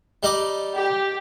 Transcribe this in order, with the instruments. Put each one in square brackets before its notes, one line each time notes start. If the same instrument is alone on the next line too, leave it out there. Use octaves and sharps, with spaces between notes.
[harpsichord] G3 D#4 D5
[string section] G4